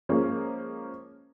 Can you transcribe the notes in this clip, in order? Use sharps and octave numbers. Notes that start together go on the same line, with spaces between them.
F3 G#3 A#3 C#4